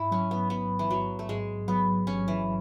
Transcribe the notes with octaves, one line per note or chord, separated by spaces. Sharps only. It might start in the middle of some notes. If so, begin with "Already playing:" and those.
Already playing: G#2 E4
F#3 C#4
B3
A1 B3
E3
A1 F#3
A3
G#2 G#3
F#3 B3
A1 C#4
E3